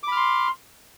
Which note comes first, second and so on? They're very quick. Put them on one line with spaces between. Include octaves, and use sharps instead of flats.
D6 B5 F6 C6